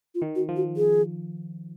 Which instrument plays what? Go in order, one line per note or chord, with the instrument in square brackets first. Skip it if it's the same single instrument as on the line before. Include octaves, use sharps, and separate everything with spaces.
[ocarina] F4
[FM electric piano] D#3
[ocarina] F#4
[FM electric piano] F3
[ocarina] F#4
G#4